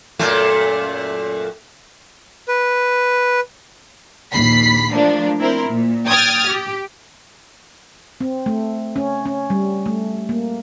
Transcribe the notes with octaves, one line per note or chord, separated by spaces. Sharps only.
F#2 A#2 A3
B4
A#1 D#2 B5 B6 C7
F3 A3 A#3 D4
C4 E4 A#4 C5
A#2
G5 D#6 F6 G#6 A6
G4
C4
A3
C#4
C#4
G3
A3
A#3